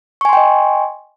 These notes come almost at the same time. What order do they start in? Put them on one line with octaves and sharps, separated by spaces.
C#6 G#5 C6 G5 D#5